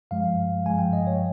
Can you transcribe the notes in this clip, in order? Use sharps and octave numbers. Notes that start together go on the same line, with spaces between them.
G2 F3 G#3 F5
G2 F3 G#3 G#5
G5
D#5
C#5